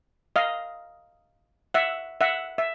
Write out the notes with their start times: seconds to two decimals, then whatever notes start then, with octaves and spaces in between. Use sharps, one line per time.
0.36 D#5 F5
1.74 E5 F#5
2.21 E5 F#5
2.58 E5